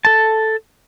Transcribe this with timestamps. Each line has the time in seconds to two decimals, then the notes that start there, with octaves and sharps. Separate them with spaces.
0.05 A4 A5